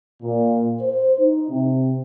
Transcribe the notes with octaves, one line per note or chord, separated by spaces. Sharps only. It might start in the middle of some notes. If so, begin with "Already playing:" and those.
A#2
C5
D#4
C3